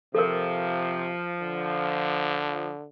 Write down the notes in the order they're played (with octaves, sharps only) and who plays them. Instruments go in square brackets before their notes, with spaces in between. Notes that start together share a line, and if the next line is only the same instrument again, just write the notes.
[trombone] C3 [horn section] F3 [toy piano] A4 A#4
[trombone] D3